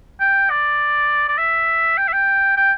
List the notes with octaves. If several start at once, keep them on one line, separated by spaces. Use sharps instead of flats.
G5
D5
D5
E5
G5
E5
G5
G5